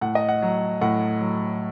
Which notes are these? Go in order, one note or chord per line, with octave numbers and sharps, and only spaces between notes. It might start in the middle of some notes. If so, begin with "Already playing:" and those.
A2 F#5
D#5
F#5
F#3
A2 F#5
F#3